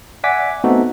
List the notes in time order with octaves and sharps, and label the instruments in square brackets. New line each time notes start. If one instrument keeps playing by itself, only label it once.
[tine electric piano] D5 E5 F#5 G#5 D6 B6
A3 B3 C4 D#4 F#4 A4